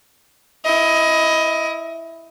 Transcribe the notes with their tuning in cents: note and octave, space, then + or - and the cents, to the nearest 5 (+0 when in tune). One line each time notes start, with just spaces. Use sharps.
E4 +0 D#5 +20